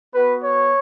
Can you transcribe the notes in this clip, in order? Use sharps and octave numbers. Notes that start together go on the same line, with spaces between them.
B3 F#4 B4
C#5